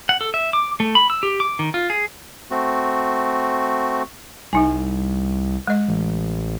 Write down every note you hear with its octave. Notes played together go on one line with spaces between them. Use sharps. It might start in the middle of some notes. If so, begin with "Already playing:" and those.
F#5
A4
E5
D6
A3
B5
E6
G4
D6
D#3
F4
G#4
A3 C4 F#4
C2 G3 D#4 G#5
G#3 D#5
A1